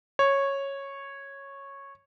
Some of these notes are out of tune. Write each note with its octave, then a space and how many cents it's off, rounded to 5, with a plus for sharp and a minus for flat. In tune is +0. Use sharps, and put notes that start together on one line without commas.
C#5 -10